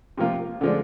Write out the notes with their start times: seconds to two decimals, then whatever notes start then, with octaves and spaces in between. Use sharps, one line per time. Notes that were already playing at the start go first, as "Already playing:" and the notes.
0.17 C3 F3 A#3 F4
0.61 D3 F3 G#3 D4